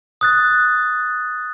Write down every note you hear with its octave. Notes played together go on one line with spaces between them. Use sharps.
D#6 F#6 A6